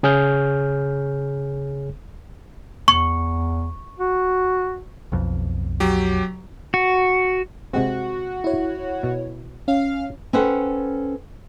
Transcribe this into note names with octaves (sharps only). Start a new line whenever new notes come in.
C#3 G#4 C#5 F6 G6
E2 C#6
F#4
B1 F2
F#3 G4
F#4
C3 G#3 C4 F#4
E4 C#5
B2
C#4 F5
C#4 A4 B4 C5 F#5 G5